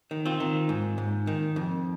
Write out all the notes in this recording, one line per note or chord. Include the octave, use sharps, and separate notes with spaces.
D#3
C4 F4
D#3
G#2
G#2
D#3
F2